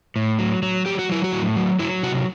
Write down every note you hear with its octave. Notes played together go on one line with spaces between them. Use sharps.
A2
F#3
F#3
F#3 G4
F#4
F#3 E4
F#4
A2
F#3
F#3 E4
C3 F#4